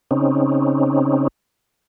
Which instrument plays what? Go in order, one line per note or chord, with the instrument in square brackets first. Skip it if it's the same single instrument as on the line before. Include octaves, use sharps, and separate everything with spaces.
[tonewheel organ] C#3 C4 C#4 D#4